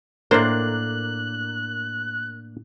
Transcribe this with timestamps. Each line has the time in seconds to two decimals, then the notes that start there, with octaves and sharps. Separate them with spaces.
0.31 A2 A#3 D4 A#4 C5 F#6